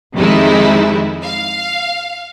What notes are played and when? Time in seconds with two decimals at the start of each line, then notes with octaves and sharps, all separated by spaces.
0.16 F2 D#3 G3 G#3 D#4 E4
1.24 F5